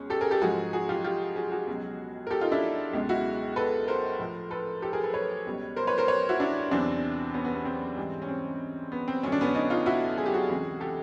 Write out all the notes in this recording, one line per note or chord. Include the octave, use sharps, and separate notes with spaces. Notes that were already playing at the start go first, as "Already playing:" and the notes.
Already playing: C#2 B2 G#3 C#4
G4 A4
G#4 A#4
G4 A4
G#2 F3 G#3 F#4 G#4
F#4 G#4
F4 G4
F4 G4
F#4 G#4
F#4 G#4
C#2 B2 F#3
A#4
G4 A4
D#4 F4
D4 E4
C#2 B2 G#3
E4 F#4
A4 B4
A#4 C5
A2 F3 A3
A4 B4
G4 A4
G#4 A#4
A4 B4
B4 C#5
C#2 B2 G3
A#4 C5
B4 C#5
A#4 C5
B4 C#5
E4 F#4
D4 E4
E2 C3 E3 C4 D4
B3 C#4
B3
B3
C4
G#2 E3 G3
C#4
C4
B3
C4
F2 D3 F#3 A3 C#4
D4
B3 C#4
C#4 D#4
D#4 F4
E4 F#4
G#4
G4
F#4 G#4
C#2 C3 E3
G4 A4